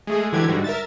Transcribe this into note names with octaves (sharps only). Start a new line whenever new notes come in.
G#3 A3 G#4
D3 E3 F#3 G4 G#6
G#2 D3 G3 F#4
A#4 E5 A6